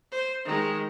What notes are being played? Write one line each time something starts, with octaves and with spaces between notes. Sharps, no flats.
C5
D#3 G#3